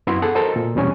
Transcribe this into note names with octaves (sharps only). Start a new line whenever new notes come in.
F#2 B3 E4 F#4 E5 C6
G#4 A4 F#5
F#4 A4 A#4 C5 D#5
A#2
E2 B2 G3 C#4 G#5